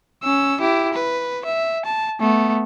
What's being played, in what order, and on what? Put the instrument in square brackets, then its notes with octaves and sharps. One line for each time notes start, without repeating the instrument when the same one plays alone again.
[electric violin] C#4 E6
E4 G4
B4
E5
A5
A3 B3